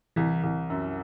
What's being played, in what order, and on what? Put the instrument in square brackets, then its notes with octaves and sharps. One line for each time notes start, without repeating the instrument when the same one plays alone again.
[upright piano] C2 [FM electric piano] E3
[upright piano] C2
F#2